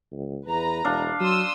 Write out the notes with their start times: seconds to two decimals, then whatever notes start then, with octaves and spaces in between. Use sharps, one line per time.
0.12 C#2
0.47 E2 B4 A#5
0.85 E1 D4 F5
1.20 F#3 C6 D#6 E6